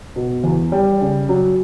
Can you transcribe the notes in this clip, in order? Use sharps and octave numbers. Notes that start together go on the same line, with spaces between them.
B2
E2
G3
C#3
F#3